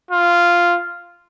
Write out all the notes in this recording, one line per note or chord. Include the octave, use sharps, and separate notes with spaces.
F4